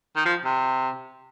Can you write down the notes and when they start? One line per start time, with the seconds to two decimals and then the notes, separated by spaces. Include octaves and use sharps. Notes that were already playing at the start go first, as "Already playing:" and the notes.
0.16 D#3
0.25 F3
0.45 C3